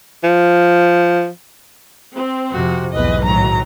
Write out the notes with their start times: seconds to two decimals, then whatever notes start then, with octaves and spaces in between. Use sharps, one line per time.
0.24 F3
2.15 C4
2.52 F2 C3 F#4
2.93 B1 E2 G#2 B4 D#5
3.25 A2 D#3 F#3 A#5